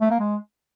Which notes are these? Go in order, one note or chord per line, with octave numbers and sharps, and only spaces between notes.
A3
A#3
G#3